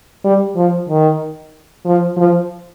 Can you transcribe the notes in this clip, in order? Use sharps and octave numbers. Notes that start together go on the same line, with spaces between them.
G3
F3
D#3
F3
F3